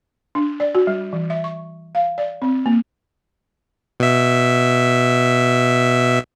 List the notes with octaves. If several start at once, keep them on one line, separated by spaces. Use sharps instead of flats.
D4
D5
F#4
G3
E3
E5
C#6
F5
D5
C4
A#3
B2 E5